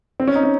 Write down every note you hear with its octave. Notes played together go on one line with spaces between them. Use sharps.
C4
C#4
D#4
C#4